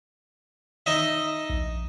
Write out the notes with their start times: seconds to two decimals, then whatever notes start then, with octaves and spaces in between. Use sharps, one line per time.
0.86 D#4 D#5 E5
1.50 A#1